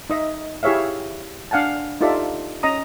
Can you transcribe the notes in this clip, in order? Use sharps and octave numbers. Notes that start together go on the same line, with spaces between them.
D#4 D#5 E5
E4 G4 G#4 C#5 E5 F5
D4 F5 F#5 G#5 A5
D#4 F4 G4 A4 D5 E5
C#4 D#5 A#5 D#6